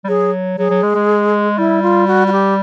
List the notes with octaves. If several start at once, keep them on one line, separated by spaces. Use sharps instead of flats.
G3
F#3 G#4
F#3 G#4
F#3
G#3
G#3
G3 E4
F4
F#4
F#4
G4